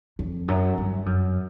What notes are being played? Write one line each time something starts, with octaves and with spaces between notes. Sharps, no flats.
F2
F#2
G2
F#2